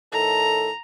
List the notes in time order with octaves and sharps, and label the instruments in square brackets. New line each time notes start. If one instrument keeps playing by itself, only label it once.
[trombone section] A2 D#3 A4 [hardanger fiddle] A#5